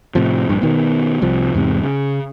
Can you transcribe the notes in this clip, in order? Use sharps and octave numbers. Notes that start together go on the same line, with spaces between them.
A2 C3 F3
A#1 G2
B2 D#3 B3
C2 C3 F3
E2 G#2 C3
C#3